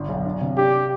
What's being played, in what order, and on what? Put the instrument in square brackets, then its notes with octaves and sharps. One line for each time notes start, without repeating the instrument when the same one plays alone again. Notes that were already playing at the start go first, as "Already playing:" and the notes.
Already playing: [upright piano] G1 D4
B1
D4
C3
[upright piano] D4 [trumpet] G4